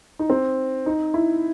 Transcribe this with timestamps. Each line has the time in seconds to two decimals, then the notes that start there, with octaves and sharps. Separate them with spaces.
0.19 D#4
0.30 C4
0.86 D#4
1.14 E4